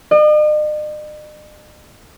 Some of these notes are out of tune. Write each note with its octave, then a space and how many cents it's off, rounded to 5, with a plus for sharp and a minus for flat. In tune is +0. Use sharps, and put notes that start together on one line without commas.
D#5 -45